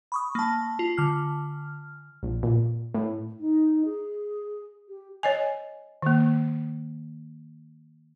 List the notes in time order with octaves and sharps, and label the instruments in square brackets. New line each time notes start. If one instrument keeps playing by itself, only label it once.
[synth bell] B5 C#6 D#6
A#3 A5
F4
D3 F6
[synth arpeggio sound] A#1
A#2
A2
[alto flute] D#4
G#4
G4
[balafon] C#5 D#5 G#5
D#3 A#3